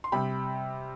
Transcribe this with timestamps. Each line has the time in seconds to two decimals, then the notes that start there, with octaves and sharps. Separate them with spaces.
0.04 C6
0.12 C3 G3 G5 B5